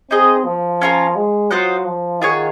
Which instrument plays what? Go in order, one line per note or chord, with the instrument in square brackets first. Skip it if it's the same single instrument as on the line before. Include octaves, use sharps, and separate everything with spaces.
[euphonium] C4 [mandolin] D#4 G#4 D#5
[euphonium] F3
[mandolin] C#4 F4 A#4
[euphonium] G#3
[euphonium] F#3 [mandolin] F4 C5 D#5 F#5
[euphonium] F3
[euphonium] D#3 [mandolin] F4 G#4 C#5 F#5